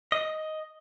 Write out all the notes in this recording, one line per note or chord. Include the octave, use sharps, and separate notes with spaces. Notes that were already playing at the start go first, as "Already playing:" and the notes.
D#5